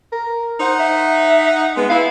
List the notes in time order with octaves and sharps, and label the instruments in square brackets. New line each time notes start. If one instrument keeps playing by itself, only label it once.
[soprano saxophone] A#4
[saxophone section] D#4 F#5 [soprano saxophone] C5
[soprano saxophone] E5
[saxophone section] G#3 B3
[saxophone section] E4 [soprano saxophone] F5